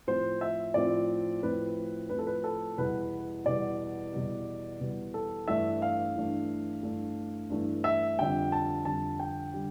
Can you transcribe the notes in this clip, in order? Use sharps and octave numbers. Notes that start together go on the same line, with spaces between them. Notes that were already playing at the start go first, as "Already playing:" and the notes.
A2 F3 C4 C5
E5
A2 F3 C4 D5
A2 F3 C4 B4
A2 F3 C4 B4
A4
B4
A4
E2 B2 G3 B3 B4
E2 B2 G3 B3 D5
E2 B2 G3 B3
E2 B2 G3 B3
A4
G2 E3 A3 D4 E5
F5
G2 E3 A3 D4
G2 E3 A3 D4
G2 E3 A3 D4
E5
F2 D3 G3 G5
A5
F2 D3 G3 A5
G5
D3 G3